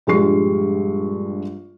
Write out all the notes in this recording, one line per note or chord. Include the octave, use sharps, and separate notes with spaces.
A#1 G2 G3 G#3 C#6 C7